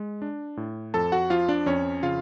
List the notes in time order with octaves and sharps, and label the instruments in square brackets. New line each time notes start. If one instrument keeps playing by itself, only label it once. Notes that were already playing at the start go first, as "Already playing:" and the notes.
Already playing: [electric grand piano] G#3
D4
A2
F2 A4 A5
F#4 F#5
F3 F4 F5
D4 D5
F2 C#4 C#5
C#3 F4 F5